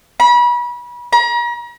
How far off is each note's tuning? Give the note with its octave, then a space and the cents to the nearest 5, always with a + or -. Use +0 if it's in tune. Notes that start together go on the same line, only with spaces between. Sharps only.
B5 -35
A#5 +40